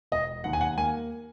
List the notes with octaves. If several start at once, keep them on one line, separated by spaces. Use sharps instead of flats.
E1 D#5
D#2 F#5
G#5
F#5
A#3 G#5